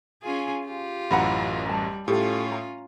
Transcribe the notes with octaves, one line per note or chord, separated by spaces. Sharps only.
C#4 F4 G#4
F4 G4
A1 F#2 E4 F#5 A#5 B5
G3 A5
A2 C#4 F4 G4 A4
A#5